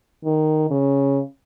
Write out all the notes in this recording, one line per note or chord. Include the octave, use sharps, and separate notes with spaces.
D#3
C#3